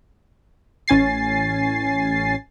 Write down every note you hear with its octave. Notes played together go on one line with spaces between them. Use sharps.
A1 C#4 G#5 A6 C7